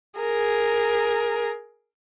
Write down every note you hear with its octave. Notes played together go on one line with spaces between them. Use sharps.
G#4 A#4